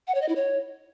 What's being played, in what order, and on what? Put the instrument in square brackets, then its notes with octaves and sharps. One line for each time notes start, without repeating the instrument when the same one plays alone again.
[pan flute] F#5
C#5
D#5
E4
C#5